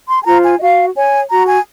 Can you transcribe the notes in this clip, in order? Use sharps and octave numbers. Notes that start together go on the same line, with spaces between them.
C6
G#5
F4 C5 A#5
G#5
D#5
F#4 F5
C#5 G#5
F#4 A#5
G#5